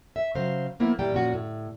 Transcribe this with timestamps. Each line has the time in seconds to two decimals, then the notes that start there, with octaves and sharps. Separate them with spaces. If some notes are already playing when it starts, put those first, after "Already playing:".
0.16 E5
0.35 C#3 F#3 C5 F5
0.80 F3 A#3 B3 E4
0.99 A#2 E3 G3 G5 A#5
1.14 A#2 F3 C#4 F#4
1.34 A2